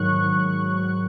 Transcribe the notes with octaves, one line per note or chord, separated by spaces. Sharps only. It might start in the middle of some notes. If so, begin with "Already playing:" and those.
Already playing: G#2 D#3 F#3 C#6 F#6